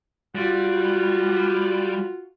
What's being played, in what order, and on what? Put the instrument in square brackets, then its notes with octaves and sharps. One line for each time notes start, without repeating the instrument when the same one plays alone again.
[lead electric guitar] G3 [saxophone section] F4 F#4